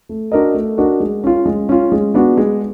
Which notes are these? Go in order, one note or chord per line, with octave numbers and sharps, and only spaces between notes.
A3
D4 F#4 A#4 D#5
A3
D4 F#4 A#4 D#5
G#3
C#4 F4
G#3
C#4 F4
G#3
B3 D4 F#4
G#3